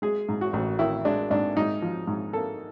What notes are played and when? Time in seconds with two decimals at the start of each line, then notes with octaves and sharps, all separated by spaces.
0.02 G#3 G#4
0.29 G#2
0.41 F#4
0.53 A1
0.79 D#3 E4
1.05 G#3 D4
1.30 G#2 D4
1.57 G#2 D#4
1.82 F3
2.07 G#2
2.33 A#3 A4